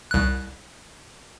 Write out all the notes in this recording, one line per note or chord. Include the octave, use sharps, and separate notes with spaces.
C2 F#6